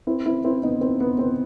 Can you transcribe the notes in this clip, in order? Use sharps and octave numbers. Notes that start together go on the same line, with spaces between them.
C4 E4
C4 E4
C4 E4
B3 D#4
C4
B3
C4